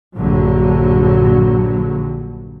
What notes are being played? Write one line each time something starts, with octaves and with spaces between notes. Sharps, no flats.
A#1 G2 D3 F#3